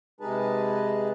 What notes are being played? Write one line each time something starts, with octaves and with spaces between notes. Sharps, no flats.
C3 G#3 D#4 G#4 B4 A5